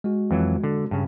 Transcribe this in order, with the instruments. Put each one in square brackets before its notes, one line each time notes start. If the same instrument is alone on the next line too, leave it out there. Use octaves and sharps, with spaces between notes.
[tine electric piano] G#3 F#4
[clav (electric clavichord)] F2 E3 F#3
D3
G2 C#3